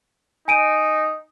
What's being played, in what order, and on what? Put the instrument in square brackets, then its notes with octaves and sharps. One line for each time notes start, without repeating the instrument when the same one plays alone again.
[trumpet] D#4 [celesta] G#5 D7 D#7